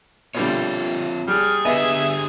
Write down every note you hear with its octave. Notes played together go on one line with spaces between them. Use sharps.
B2 D3 G3 C4 F4 C#5
G3 G#4 F6 G#6
D3 B3 G4 D#5 E5 G#5